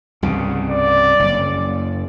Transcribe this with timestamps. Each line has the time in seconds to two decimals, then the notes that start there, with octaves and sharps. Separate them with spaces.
0.23 C2 G2 C#3
0.70 D5
1.19 F#1